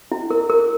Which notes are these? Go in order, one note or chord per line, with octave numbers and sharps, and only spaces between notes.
E4
A#4
A#4